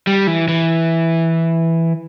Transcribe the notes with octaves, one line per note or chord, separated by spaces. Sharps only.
G3
E3
E3